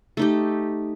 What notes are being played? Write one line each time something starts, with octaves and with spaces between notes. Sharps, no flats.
A3 D#4 G4